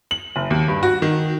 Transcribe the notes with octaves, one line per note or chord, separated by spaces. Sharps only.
F#7
F#1
D#2
G2
F#4
D#3